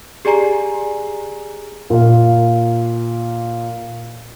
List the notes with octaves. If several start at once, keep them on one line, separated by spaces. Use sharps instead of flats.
G4 G#4 D5 G#5 A#5 C7
A#2 F5